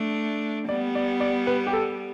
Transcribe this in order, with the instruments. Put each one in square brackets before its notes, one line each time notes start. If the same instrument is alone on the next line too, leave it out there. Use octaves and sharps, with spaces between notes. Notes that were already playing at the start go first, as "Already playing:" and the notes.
Already playing: [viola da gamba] A3 D4
[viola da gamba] G3 B3 [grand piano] D5
[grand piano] D5
D5
B4
G4
A4